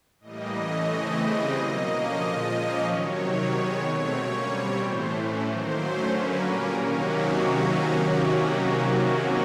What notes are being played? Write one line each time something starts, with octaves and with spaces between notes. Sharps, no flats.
A2 E3 G3 A#3 D#5
E3 A3 C#4
C#3 E3 A3 C4
C#3 E3 G3 C4
B2 F#3 A#3 D#5
D3 F3 A#3 C#4
A#2 F3 G#3 D#5
A#2 F3 A#3 C#4
C3 D#3 F#3 C#5
C3 D#3 F#3
D#3 G#3 B3 C#5
B2 F#3 A3 C4
D3 G3 A#3 C#4
B2 G3 C4
A2 E3 A3 C5
A2 E3 A3 C#4
D#3 F#3 A#3 C5
D3 F#3 A3 C#4
D3 F#3 A#3 C#4 B4
A#2 G3 A#3 C#4 A#4
C3 D#3 F#3 A#3 C#4 F#4